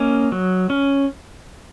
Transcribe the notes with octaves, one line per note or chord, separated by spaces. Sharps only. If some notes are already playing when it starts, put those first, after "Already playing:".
Already playing: A#3 C#4 D#5
F#3
C#4